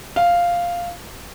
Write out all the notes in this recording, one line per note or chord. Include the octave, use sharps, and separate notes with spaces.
F5